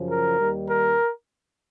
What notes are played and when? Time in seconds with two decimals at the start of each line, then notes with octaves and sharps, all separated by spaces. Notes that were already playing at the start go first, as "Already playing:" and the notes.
Already playing: F#2 C#3 F3
0.10 A#4
0.40 D#2 D#3 G3
0.69 A#4